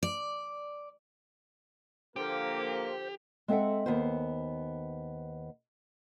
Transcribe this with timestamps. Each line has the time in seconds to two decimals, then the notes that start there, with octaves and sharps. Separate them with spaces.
0.03 D5
2.16 D3 F3 A#3 G4 A#4 C5 G5
3.48 G#3 C4 A4 E5 F#5
3.86 D#2 B3 C5